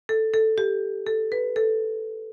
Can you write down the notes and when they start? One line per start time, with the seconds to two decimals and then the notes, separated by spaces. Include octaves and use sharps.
0.09 A4
0.34 A4
0.58 G4
1.07 A4
1.32 B4
1.56 A4